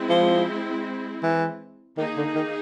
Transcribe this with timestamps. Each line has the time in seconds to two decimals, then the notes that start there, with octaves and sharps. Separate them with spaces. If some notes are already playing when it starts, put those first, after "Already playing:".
Already playing: G#3 C4 E4
0.10 F3
1.23 E3
1.97 D#3 A#3 D#4 G#4
2.17 D3
2.35 D#3